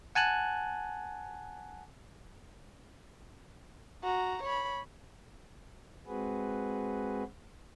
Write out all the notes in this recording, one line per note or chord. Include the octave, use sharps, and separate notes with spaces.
F#5 G#5 A5 F#6
F#4 A#5
C#5 B5
G#3 C4 F#4 G#4 B4